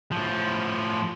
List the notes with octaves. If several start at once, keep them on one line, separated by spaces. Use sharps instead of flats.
A2 F3